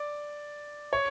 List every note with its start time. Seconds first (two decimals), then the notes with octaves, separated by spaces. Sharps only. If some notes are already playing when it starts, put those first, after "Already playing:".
Already playing: D5
0.93 C#5